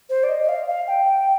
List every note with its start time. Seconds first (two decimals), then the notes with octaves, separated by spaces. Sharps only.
0.09 C5
0.23 D5
0.28 D#5
0.42 D#5
0.48 F5
0.67 F5
0.87 G5